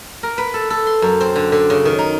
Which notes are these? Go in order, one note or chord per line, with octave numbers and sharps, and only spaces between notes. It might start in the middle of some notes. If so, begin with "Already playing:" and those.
A#4
B4
A4
A4
C6
F#2
C4
D3
D3
C#3
D#3
D#4